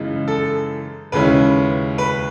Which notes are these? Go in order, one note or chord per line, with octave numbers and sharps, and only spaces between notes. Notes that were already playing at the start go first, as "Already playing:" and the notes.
Already playing: F#2 C#3 E3 G#3 D#4
A4
D#2 C#3 G#3 C#4 E4 B4
B4